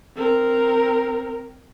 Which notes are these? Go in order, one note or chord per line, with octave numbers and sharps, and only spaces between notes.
C4 A#4